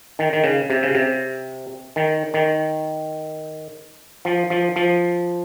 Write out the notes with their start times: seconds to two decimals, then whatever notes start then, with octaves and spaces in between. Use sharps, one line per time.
0.19 D#3
0.33 D#3
0.44 C#3
0.70 C3
0.83 C#3
0.95 C3
1.96 D#3
2.34 D#3
4.25 F3
4.50 F3
4.76 F3